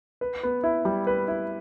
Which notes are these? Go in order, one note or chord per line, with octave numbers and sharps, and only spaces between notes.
B4
B3
E4
G3
B4
E4